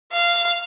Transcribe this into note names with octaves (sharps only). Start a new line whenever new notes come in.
F5